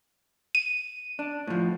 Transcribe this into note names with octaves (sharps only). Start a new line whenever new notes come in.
D#7
D4
A2 F3